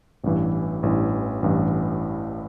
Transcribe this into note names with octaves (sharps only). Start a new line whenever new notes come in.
A1 G2 E3
A1 G2 E3
A1 G2 E3